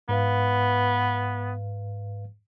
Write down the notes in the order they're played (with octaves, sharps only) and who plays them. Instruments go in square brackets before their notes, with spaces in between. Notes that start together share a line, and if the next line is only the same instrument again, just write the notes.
[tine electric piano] G#2 B4 F5 [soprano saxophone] B3